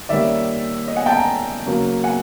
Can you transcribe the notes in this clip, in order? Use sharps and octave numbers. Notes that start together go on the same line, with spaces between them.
D#3 G3 A#3 C#4 D5 E5
C#5 D#5
F#5 G#5
G5 A5
G#5 A#5
C#3 F#3 A#3
F#5 G#5